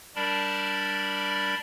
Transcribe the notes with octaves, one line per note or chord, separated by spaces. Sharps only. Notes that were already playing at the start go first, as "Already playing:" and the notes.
G3 D4 A#4 D5 A5 B5